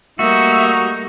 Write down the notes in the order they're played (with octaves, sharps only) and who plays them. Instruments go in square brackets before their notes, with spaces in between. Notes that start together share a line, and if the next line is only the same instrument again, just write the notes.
[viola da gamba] G3 A3 A#3 [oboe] D#4 [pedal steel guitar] F#4 [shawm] E5